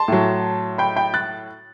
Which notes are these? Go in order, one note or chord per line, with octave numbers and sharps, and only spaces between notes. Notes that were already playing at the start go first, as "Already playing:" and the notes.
Already playing: A5 C6
A2 F#3
G5 B5
G5 B5
F#6 A6